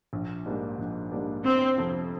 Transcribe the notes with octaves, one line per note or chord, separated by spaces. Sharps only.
A#1
G#2 G3 A#3 D4
A#1
G#2 G3 A#3 D4
G1 C4
F2 C3 F3 C4